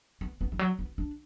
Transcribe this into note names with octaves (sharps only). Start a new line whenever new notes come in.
B3
B3
E3
F#3
B3
D4